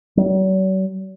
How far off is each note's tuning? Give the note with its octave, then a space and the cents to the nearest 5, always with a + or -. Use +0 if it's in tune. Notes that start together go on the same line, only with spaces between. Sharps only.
F#3 +45